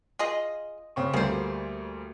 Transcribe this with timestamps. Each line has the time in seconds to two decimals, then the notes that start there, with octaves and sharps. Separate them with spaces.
0.19 F4 G#4 D#5
0.96 C#3 C4 C#6
1.13 D2 G3 A#3 G#4 C5